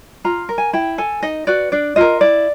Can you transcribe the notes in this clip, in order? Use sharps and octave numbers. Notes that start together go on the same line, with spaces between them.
F4 A#5
A#4
G#5
E4 G5
A4 G#5
D#4 D#5
F#4 B4 D5
D4 D5
F4 A#4 D#5
E4 D5